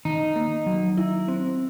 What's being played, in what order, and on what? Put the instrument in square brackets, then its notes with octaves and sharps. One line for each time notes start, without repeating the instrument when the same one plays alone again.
[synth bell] D#3 [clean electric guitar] D#4
[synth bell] A#3
F#3
E4
C4